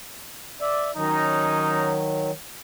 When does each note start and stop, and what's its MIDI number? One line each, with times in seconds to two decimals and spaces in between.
0.61 0.91 74
0.61 0.91 76
0.97 2.31 51
0.97 2.31 54
0.97 1.98 61
0.97 1.98 63